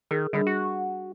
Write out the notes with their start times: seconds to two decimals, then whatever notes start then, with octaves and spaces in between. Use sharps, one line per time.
0.11 D#3 G#4 A#4
0.33 D3 G3 D4 G#4
0.47 F#4